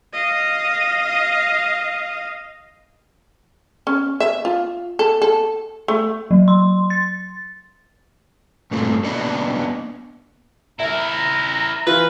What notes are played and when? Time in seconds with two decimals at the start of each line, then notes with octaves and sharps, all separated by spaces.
0.13 D#5 F5
3.87 C#4
4.20 E5
4.45 F4
4.99 A4
5.22 A4
5.88 A3
6.31 F#3
6.48 C6
6.90 A6
8.71 G2 A#2 A3 C4
9.04 A#3 B3 D4 B4 D#5
10.80 E4 A#4 E5 A#5
11.87 E3 F4 B4